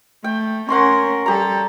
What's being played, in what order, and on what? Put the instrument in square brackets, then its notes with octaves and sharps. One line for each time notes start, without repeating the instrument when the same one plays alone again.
[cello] A3 [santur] G5
[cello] C#4 A#4 [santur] F#5 C6 C#6
[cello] G3 A4 [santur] G4 A#5